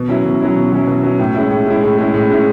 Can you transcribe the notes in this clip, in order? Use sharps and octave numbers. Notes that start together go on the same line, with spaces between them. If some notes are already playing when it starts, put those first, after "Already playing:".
Already playing: B2
F#3 C#4 E4
B2
F#3 C#4 E4
B2
F#3 C#4 E4
B2
F#3 C#4 E4
A2
G#3 C#4 E4
A2
G#3 C#4 E4
A2
G#3 C#4 E4
A2
G#3 C#4 E4